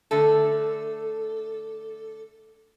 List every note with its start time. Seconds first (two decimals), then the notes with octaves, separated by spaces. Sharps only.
0.11 D3 A3 A4